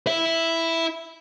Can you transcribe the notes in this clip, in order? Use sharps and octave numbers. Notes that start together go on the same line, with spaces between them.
E4 E5